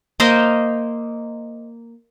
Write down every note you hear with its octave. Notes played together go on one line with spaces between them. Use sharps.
A#3 C5 D#5 F5